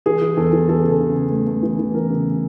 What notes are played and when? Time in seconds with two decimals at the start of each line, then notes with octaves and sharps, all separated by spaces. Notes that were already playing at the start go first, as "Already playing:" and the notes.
0.06 E3 G#4
0.22 E3
0.37 E2 A4
0.53 E3
0.69 E3 A4
0.80 C#3 G#4
0.92 A4
1.00 C#3
1.16 C#3
1.32 A3
1.47 A3
1.63 E3
1.79 E3
1.94 E2 A#4
2.10 C#3